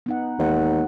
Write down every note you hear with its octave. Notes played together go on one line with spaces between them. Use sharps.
B3 D#4 F#5
D#2 E3 G#3 F#5